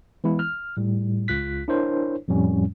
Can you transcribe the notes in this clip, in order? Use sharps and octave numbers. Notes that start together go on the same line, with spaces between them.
E3 G#3 B3 E4
F6
A2 G3
C#2 F4 F#6 B6
D4 E4 A#4 C5 C#5
F2 A2 F3 G3 C#4